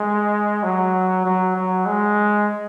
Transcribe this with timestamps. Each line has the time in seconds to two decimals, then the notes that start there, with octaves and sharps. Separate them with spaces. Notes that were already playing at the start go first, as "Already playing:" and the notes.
Already playing: G#3
0.63 F#3
1.25 F#3
1.55 F#3
1.86 G#3